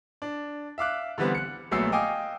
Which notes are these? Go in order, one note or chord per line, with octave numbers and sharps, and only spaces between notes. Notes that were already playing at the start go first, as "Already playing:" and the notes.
D4
E5 F5 D6 F#6
D3 E3 G3 B3 C4
F#6 C#7
A#1 F#3 A3 B3 E6 C7
D#5 F5 G5 G#5 D6 D#6